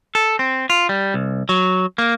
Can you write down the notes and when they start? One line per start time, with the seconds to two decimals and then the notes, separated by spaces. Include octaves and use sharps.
0.15 A4
0.39 C4
0.70 F4
0.89 G3
1.14 C2
1.49 F#3
1.98 A#3